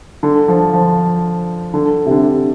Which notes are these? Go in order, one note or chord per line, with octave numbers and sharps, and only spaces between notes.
D3
F3
F3
D3
C3
D3